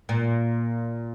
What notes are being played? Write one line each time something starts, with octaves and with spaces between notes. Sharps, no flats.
A#2